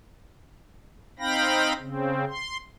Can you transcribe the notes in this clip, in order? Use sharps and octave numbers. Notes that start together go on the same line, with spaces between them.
C4 D#4 F5 G5 B5 A#6
C#3 C4
C6